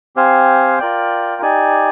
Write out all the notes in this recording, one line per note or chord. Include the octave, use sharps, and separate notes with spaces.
C4 G4 C5 F5 G#5
F4 A#4 D5 G5
D#4 G4 D5 G#5